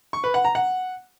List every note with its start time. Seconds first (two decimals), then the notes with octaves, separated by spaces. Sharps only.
0.13 C#6
0.24 B4
0.34 F#5
0.45 A#5
0.55 F#5